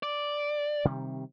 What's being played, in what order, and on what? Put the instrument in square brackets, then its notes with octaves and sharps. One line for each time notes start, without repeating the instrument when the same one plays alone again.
[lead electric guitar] D5
[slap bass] C3 D#3 G3